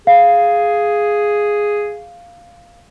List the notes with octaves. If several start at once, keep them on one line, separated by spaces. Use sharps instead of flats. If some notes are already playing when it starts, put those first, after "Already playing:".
G#4 F5